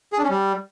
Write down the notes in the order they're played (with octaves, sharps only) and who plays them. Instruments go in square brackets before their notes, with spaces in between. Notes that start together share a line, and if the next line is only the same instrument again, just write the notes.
[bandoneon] G#4
D4
C#4
G3